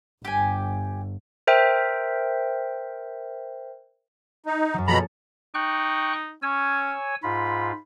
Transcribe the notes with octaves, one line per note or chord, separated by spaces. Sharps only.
G1 G4 G#5
A#4 C5 E5 G5
D#4
F#2 F#3
B2 F3 A#3 A4 A#5 B5
D#4 G5 C#6 F#6
C#4 C#5 G#5 E6
G#2 F4 B5